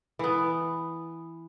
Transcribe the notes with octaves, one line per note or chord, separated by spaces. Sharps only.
E3 B3